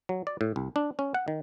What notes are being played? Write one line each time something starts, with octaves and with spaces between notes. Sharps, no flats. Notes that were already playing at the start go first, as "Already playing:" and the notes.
F#3
D5
A2
C2
D4
C#4
F#5
D#3